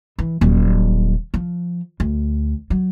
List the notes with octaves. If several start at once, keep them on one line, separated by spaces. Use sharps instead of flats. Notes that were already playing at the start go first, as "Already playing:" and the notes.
E3
D#1 F#3
F3
D2
F#3